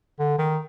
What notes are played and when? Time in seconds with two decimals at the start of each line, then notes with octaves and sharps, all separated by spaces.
0.19 D3
0.38 D#3